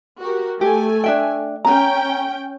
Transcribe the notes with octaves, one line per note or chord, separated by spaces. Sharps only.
F#4 G4 A#4
A3 G4 A4 G#5
D4 E5 G5
C#4 G5 A#5